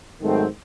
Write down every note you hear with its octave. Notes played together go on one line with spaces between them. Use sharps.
G#2 D#3 F#3 A3 C4